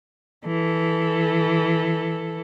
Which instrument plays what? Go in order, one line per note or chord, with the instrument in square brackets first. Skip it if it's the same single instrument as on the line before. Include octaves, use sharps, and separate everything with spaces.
[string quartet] E3 A4